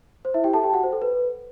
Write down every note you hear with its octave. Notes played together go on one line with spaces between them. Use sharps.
C5
E4 E5
G4 G5
A4 A5
G4 G5
F#4 F#5
C5
A4
B4